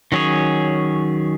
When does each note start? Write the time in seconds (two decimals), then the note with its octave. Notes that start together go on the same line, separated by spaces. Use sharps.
0.12 D#3 F#3 C#4 G#4 C#5